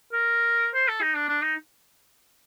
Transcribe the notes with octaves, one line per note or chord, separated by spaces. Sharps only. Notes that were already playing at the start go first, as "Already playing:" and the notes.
A#4
C5
A4
D#4
D4
D4
D#4